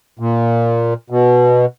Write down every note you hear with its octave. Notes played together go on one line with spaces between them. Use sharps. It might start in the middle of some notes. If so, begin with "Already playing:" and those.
A#2
B2